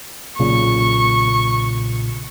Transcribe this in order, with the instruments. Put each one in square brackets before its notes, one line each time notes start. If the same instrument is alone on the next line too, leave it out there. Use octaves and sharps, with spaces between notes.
[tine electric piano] B1 A#2 C#3 [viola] C#6